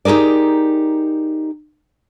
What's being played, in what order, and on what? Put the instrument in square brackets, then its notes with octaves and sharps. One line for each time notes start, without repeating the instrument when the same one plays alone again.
[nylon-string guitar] D#4 G4 G#4 A#4 D5